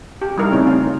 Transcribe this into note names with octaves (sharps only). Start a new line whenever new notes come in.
G4
D3 G3 D#4 E4 A#4
C#3 A3 C4 C#4 D#4
F4